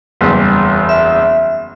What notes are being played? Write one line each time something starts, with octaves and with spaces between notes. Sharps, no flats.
F#1 E2 G3
E5